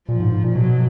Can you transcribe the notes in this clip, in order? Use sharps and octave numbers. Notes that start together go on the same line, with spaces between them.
A#2 F3
G#2
G#2
A#2
B2 F#3